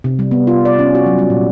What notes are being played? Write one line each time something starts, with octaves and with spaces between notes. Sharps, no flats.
C3
G3
B3
F4
D5
C#4
F#4
F#3
G3
A#2